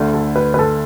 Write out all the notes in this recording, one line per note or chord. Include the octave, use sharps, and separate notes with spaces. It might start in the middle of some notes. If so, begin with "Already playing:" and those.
Already playing: D2 D3 A3
A4
B4
B4
A4